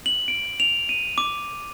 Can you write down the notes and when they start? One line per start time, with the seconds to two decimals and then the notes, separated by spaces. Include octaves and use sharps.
0.06 F#7
0.28 D7
0.60 F7
0.89 D#7
1.18 D6